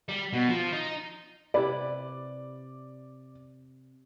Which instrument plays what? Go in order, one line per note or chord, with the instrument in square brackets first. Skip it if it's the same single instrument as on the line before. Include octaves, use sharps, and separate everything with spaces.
[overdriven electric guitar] G3
B2
F3
D#4
[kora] C3 E4 B4 [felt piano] D5